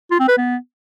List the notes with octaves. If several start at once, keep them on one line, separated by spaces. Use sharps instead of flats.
F4
C4
B4
B3